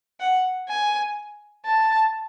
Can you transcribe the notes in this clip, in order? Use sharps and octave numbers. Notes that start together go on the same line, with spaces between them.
F#5
G#5
A5